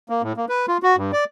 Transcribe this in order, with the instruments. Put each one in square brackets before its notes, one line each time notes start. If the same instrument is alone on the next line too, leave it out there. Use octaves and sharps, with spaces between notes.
[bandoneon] A#3
A2
A#3
B4
F4
F#4
G2
D5